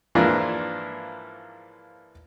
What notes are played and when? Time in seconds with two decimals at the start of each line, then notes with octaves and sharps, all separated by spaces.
0.15 G#2 E3 F3 A#3 D4 F4